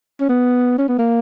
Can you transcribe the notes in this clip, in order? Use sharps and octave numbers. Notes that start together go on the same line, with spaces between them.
C#4
B3
C#4
B3
A#3